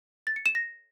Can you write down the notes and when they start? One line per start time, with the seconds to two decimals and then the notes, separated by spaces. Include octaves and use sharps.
0.27 A6
0.36 C#7
0.46 E7
0.55 A#6